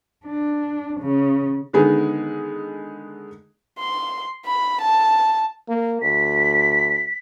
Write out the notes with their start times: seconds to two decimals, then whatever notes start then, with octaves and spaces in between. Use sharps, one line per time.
0.25 D4
1.00 C#3
1.73 D3 D#3 G#3 B3 D#4 G#4
3.78 C6
4.45 B5
4.81 A5
5.68 A#3
6.02 D2 B6